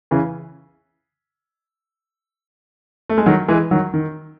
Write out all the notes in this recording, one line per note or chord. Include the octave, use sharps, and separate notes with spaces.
C#3 E3
A3
G#3
D#3 F#3
E3 G#3
D#3 F#3
D#3